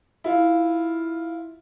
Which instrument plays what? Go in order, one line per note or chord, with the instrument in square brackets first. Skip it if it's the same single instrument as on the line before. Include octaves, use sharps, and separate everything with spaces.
[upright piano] E4 F4